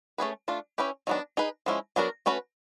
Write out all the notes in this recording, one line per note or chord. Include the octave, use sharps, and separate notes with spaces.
A3 C#4 E4 G#4 B4
A3 D4 F4
C#4 E4 G4 B4
D#3 F#3 B3 D4
D#4 G#4 B4
F3 G#3 C#4 E4
F#3 B3 D4 F#4 A#4
A3 C#4 F#4 B4